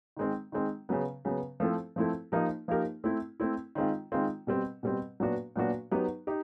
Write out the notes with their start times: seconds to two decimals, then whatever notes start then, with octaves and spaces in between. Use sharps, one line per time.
0.17 D#3 G#3 C4
0.52 D#3 G#3 C4
0.89 C#3 F#3 B3
1.25 C#3 F#3 B3
1.60 F3 A3 C4 E4 A4
1.96 F3 A3 C4 E4 A4
2.32 F3 A#3 D#4 G4 A#4
2.68 F3 A#3 D#4 G4 A#4
3.04 A3 C4 E4
3.40 A3 C4 E4
3.75 D#3 G#3 C4 F4
4.12 D#3 G#3 C4 F4
4.47 B2 G3 C4
4.83 B2 G3 C4
5.20 A#2 F#3 B3 D4 F#4
5.56 A#2 F#3 B3 D4 F#4
5.91 F#3 B3 D#4 G4
6.27 D#4 G4